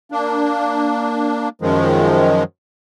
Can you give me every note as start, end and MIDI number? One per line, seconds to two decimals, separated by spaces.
0.12 1.49 58
0.12 1.49 62
1.62 2.43 42
1.62 2.43 51
1.62 2.43 53
1.62 2.43 56